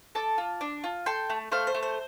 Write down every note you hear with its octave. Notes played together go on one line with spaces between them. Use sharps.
A4 A5 D6
F4
D4
F4
A4 G5 C6
A3
A3 C5 F5
C5
A3
C5